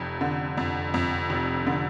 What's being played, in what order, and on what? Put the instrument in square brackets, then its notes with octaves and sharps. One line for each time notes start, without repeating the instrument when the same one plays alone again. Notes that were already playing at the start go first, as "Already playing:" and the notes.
Already playing: [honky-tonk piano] F1 F2
D3
F2
F2
F1
D3